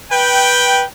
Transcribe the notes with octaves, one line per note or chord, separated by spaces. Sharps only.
B4 G5